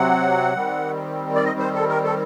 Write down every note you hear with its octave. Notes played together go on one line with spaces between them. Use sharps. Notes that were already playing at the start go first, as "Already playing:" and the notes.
Already playing: C3 F#3 C4 F#5
D#3 G3 C4
D5
D#5
C5
A4
A#4
A4